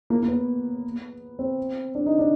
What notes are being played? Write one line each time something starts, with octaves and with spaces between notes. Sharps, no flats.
A#3
A#3
B3
C4
D4
D#4
D4